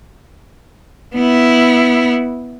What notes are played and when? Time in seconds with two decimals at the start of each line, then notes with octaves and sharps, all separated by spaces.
1.16 B3 E4